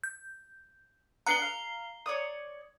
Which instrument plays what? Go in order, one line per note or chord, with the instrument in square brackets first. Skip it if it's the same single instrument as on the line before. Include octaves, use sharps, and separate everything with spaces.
[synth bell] G6
[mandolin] B3 D4 F#5 [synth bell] A#5 C7 G7
[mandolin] F5
C#5 D5 D#6